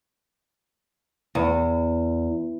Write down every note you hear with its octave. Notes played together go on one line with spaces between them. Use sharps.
E2